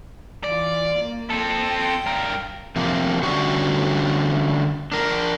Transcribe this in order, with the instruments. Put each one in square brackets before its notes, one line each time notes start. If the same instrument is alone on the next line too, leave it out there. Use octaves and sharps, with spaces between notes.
[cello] E3 F4 [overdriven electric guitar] D5
[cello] A#3
[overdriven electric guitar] C4 A4
[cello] G5
[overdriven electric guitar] G2 A#4
[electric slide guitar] C3 F3 A#3
D3 G3 A3 C#4 F#4 C#5
D4 A#4